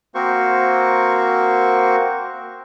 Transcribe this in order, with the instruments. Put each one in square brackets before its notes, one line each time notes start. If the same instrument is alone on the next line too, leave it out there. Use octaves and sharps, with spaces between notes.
[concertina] A#3 C4 F#4 A#4 C5 C#6